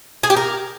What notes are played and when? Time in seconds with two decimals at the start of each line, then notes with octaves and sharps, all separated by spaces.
0.23 G#4
0.30 G4
0.36 A#4